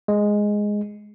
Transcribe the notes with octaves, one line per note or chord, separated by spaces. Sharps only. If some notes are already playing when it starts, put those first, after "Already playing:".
G#3